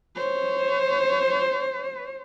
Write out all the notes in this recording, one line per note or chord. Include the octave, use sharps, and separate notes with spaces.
C5 C#5